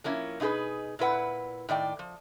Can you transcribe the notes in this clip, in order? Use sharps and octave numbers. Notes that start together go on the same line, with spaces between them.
F3 A#3 C#4 E4
B2 D#4 E4 G#4 B4
A#2 E4 B4 F#5
A2 D#3 D5 G5
F3